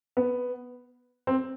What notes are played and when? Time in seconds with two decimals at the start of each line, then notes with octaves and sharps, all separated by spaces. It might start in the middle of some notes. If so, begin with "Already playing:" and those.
0.17 B3
1.27 C4